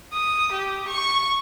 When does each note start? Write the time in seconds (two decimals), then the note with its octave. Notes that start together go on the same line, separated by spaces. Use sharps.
0.13 D#6
0.52 G4
0.87 C#6